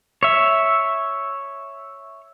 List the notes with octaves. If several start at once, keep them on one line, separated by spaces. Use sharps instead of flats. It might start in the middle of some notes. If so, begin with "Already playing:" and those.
C#5 E5